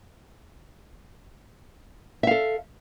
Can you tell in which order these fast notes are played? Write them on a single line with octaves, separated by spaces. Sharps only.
E5 F5 A4